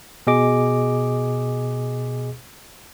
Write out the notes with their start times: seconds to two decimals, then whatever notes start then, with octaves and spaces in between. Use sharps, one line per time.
0.27 B2 G#4 D#5 D6